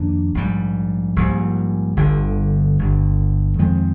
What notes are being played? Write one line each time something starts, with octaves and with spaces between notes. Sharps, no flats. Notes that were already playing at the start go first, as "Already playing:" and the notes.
Already playing: F2 D#3 A#3 D4
A#1 G#2 G3
A#1 G#2 G3
G1 G2 D3
G1 G2 D3
F2 D#3 G#3 C4